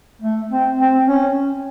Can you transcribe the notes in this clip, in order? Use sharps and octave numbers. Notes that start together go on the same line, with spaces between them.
A3
C4
C4
C#4